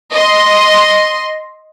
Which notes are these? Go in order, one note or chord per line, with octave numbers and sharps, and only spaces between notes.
D#5 C6